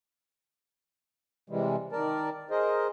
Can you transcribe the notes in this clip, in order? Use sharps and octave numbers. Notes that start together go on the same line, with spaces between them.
C3 E3 G3 G#3
D#3 A#4 D5 A5
G#4 A#4 C5 D#5